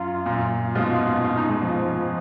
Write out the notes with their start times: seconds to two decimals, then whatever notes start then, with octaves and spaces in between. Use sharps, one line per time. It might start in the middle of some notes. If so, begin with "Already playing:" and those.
Already playing: F#2 F4
0.26 F#2 A#2
0.75 G#2 B2 F4
1.25 F4
1.37 D#4
1.50 G#3
1.62 F3